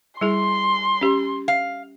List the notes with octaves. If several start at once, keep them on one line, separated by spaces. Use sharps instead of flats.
G3 E4 G#4 C6
C#4 G4
F5